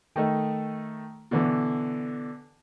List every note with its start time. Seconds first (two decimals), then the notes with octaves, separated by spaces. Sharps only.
0.16 D#3 A3 D#4
1.31 B2 D3 E3